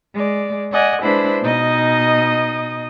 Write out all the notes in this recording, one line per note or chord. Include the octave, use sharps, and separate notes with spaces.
G#3 D5
D5 D#5 F#5 G#5
G#3 D4 E4 B4 C5 B5
B2 D#4 D#5 D#6